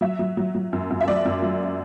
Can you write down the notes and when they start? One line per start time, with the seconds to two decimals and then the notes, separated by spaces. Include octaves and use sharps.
0.01 F#3 E5
0.19 F#3
0.37 F#3
0.55 F#3
0.73 F#2
0.90 F#2
1.01 E5
1.08 F#3 D5
1.25 F#2
1.42 F#3